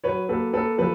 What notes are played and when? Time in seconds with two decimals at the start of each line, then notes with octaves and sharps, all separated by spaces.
0.04 F#3 B4 C#5
0.29 A#3 A4 B4
0.53 A#3 A4 B4
0.78 F3 A4 B4